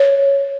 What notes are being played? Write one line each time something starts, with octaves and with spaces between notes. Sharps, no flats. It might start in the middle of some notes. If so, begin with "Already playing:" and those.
Already playing: C#5